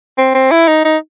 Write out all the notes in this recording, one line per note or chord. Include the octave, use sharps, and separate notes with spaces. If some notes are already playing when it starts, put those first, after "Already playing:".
C4
C4
E4
D#4
D#4